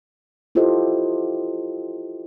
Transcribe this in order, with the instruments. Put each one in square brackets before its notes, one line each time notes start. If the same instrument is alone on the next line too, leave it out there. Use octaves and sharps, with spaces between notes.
[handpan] E4 F4 G4 A4 C5 D#5